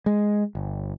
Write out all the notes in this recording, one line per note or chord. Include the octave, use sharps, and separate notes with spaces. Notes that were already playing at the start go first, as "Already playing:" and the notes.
G#3
G1